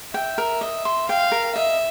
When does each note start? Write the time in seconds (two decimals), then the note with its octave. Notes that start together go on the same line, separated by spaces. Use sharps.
0.14 E5 G5
0.38 A#4
0.61 D#5
0.85 C6
1.09 F5 G5
1.32 A#4
1.55 D#5 E5